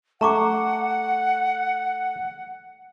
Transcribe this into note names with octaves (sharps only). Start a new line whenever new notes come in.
A3 F#5 A#5 C#6 D6